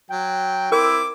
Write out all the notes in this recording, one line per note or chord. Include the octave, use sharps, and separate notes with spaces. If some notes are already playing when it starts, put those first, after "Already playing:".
F#3 G5
C4 E4 A#4 D6